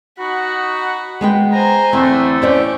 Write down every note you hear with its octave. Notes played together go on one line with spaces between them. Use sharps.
D#4 F#4 F#5 B5
G#3 B3 G5
C5 G#5 A#5
E2 D3 A3 C4
E2 C#4 C5 D5 G5